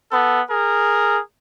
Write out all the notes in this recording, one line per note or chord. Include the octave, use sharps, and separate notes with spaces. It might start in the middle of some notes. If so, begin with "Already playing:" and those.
B3 A4
G#4 A#4